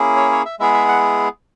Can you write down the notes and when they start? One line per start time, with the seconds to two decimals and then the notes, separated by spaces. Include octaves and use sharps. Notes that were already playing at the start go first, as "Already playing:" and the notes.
Already playing: A#3 C#4 E4 G#4
0.16 C#5
0.32 C#5
0.45 E5
0.59 G#3 B3 E4 G#4 E5
0.74 E5
0.88 F#5